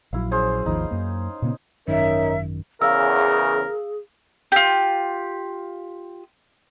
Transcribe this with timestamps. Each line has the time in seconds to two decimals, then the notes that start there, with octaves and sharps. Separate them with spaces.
0.13 A#1 C#3 F#3 E4 F5
0.31 C#4 G#4 C5
0.66 G#1 D#2 F3 D#4
0.91 F#2 A#3
1.42 A#2 C#3 B3
1.88 G#1 F#2 D#3 C#4 D#4 A#4 E5
2.82 E2 C#3 G#4 A#4 F5 E6
4.52 F4 G4